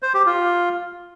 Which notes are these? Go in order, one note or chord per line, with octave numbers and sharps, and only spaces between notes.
C5
G4
F4